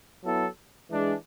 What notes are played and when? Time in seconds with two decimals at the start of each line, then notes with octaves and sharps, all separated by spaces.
0.23 F#3 B3 E4 A4
0.90 E3 G#3 D4 G#4